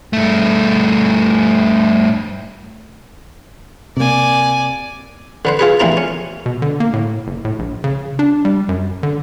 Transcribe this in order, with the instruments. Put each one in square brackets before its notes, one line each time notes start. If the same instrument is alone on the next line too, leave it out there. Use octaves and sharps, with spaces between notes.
[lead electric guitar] G2 A3
[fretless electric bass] C3 A#3 [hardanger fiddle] D5 G#5
[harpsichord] D3 B4 C5
F4 G#4 B4
A1 A#2 C4 E4 A#5
C#4
[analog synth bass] B2
D3
A#3
A2
F#1
A2
A#1
C#3
D4
G3
F#2
D3